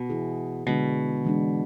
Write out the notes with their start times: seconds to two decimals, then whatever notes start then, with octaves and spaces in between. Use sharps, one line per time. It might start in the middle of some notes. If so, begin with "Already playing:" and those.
Already playing: B2
0.10 E3 B3 E4 G#4
0.67 B2 D3 G#3 D4
1.24 E3 G#3 D4